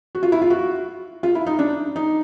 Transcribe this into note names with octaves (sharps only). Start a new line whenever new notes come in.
F#4
F4
E4
F4
F#4
F4
E4
D#4
D4
D#4